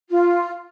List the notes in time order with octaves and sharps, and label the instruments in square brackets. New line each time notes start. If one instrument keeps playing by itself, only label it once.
[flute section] F4